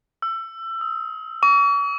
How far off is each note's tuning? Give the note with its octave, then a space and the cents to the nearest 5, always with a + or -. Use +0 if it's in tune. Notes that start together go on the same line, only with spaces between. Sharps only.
E6 +25
D#6 +45
C#6 +45